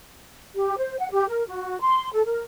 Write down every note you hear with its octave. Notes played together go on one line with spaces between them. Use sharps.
G4
C5
F#5
G4
A#4
F#4
C6
A4
A#4